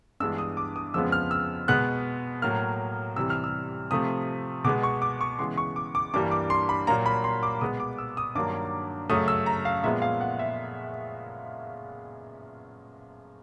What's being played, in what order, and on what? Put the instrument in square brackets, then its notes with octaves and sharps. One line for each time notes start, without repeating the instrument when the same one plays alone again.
[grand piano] G2 E3 G#3 B3 E6
D#6
D6
D#6
F2 C#3 F3 G#3 B3 E6
F6
E6
B2 G#3 B3 F#6
A2 F#3 A#3 F6
C3 E3 G3 E6
F6
E6
C3 F3 A3 D#6
B2 G#3 B3 D6
C#6
D6
C#6
C#3 E3 G#3 B3 C6
C#6
D6
D6
G2 E3 G3 A#3 D6
D6
C6
B5
A#2 F#3 A#3 A#5
B5
C6
D6
B2 G#3 B3 D#6
D6
E6
D#6
G2 D#3 F#3 A#3 D6
F#2 C#3 F#3 A3 D#6
E6
A#5
F5
A#2 F3 G#3 B3 E5
F5
F#5
E5